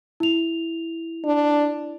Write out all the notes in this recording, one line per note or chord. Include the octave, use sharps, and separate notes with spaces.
E4 F7
D4